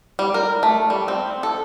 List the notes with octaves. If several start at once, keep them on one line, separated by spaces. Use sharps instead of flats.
G3
A#4
A3
G3
C4
A4